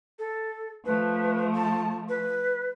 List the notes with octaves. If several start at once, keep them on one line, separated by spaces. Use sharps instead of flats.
A4
F3 A3 B4
A5
B4